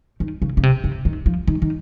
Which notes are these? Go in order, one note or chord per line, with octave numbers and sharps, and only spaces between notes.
D#3
C#3
C#3
C3
C#3
D#3
F3
D#3
D#3